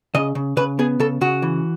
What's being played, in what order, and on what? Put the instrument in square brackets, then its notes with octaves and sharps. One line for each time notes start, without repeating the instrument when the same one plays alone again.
[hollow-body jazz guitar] C#3 D#5
C#3
C#3 B4
B3 G#4
C#3 A4
C#3 F#4
E3